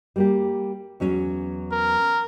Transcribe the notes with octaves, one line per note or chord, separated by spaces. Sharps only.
G3 A#3 G4
E2 F#3 C#4
A#4